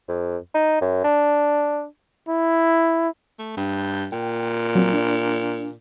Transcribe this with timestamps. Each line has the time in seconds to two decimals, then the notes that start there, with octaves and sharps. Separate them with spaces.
0.08 F2
0.55 D#4
0.81 F#2
1.04 D4
2.29 E4
3.39 A3
3.57 G2
4.12 A#2 G5
4.75 F#3 C4
4.93 D4